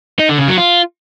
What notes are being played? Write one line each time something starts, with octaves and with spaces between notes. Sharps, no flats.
D#4
D3
C#3
F#3
F4